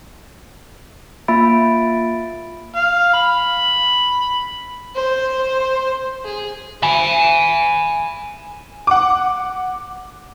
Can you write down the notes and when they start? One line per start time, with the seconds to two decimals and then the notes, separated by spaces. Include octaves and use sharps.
1.28 A#3 F4 E5 B5 A6 D7
2.76 F5
3.14 B5
4.95 C5
6.24 G#4
6.83 G#5 B5
8.87 F#5 D6